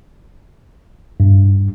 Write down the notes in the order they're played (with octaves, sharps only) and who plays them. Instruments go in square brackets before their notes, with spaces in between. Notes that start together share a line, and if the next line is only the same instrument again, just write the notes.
[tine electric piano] G2